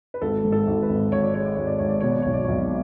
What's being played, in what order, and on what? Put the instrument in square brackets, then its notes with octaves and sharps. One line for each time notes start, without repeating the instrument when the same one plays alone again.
[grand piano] B4
G#1 A4
G#2
A4
G#1
B4
G#1
G#1 C#5
D5
G#3 C#5
D5
G#1 C#5
D5
G#1 C#5
D5
B2 C#5
D5
B1 C#5
D5
B1 C#5